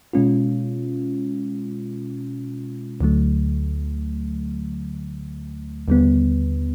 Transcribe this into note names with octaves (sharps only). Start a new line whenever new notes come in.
B2 G#3 C#4 F4
D2 D3 F#3 A3
D#2 D3 G3 B3